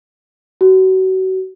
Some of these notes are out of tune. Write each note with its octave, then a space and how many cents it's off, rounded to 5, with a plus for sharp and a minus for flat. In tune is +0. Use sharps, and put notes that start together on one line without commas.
F#4 +30